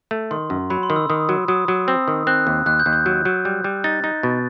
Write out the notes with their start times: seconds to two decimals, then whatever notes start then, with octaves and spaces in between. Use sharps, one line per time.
0.11 A3
0.31 D#3 C6
0.50 F#2
0.70 F#3 B5
0.83 C6
0.90 D#3
0.96 E6
1.09 D#3 D#6
1.29 F#3
1.48 F#3 D#6
1.68 F#3
1.88 C4 E6
2.08 D#3
2.27 C4 F#6
2.47 D#2
2.66 D#2 F#6
2.79 G6
2.86 D#2
2.93 G6
3.06 F#3
3.25 F#3
3.45 G3
3.64 G3
3.84 D#4 A6
4.04 D#4
4.23 B2